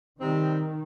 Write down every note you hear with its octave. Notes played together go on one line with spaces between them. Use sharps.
C3 D#3 G3 C4 D#4